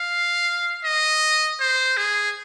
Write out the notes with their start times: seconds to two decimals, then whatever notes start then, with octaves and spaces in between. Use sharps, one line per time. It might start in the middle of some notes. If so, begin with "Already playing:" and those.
Already playing: F5
0.84 D#5
1.60 C5
1.97 G#4